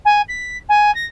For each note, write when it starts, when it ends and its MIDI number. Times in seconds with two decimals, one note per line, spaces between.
0.05 0.22 80
0.28 0.57 95
0.69 0.93 80
0.94 1.05 94